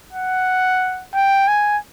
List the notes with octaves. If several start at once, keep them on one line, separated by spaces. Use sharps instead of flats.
F#5
G5
G#5